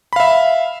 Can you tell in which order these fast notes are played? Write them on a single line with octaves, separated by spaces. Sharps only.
B5 F5 E5